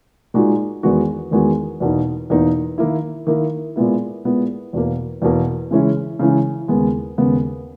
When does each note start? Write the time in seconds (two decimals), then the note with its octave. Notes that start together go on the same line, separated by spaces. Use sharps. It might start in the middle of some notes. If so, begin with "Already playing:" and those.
0.34 A#2 G#3 D#4 F#4
0.83 E2 D#3 G#3 B3 F#4
1.31 E2 D#3 G#3 B3 F#4
1.80 E2 B2 A#3 D#4
2.30 E2 B2 A#3 D#4
2.78 D#3 A#3 E4
3.27 D#3 A#3 E4
3.76 A#2 G#3 B3 E4
4.25 A#2 G#3 B3 E4
4.73 E2 B2 A#3
5.22 E2 B2 A#3
5.71 C#3 E3 G#3 C#4 E4
6.19 C#3 E3 G#3 C#4 E4
6.68 D#2 C#3 G#3 B3
7.18 D#2 C#3 G#3 B3